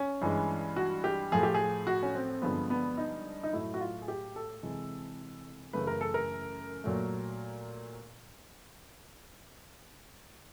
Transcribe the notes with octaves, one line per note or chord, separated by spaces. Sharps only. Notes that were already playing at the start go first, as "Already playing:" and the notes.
Already playing: C#4
G2 E3 G#3
F#4
G4
A2 F3 A3 G#4
G4
G#4
F#4
C#4
C4
G2 D3 F3 G#3 B3
B3
D#4
D#4
A2 F#3 A3 E4
F#4
F4
G#4
G4
A4
C3 E3 G#3
F#2 C#3 E3 A3 B4
A#4
A4
A#4
A#2 F#3 A3